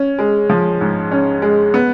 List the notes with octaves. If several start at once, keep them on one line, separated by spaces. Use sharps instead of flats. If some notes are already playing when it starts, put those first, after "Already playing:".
Already playing: C#4
G#3
F3
G#2
C#4
G#3
B3